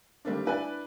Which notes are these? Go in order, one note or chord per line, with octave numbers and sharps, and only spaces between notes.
D#3 G3 A3 A#3 C4 D4
D4 E4 B4 D5 G#5